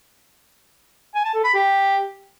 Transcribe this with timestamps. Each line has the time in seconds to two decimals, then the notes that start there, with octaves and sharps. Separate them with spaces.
1.15 G#5
1.25 A5
1.34 A4
1.44 B5
1.54 G4